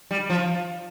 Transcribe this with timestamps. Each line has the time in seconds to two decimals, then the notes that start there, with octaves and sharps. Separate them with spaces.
0.11 G3
0.30 F3